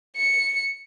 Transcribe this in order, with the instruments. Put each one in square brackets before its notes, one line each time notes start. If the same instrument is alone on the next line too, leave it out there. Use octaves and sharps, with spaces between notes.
[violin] C#7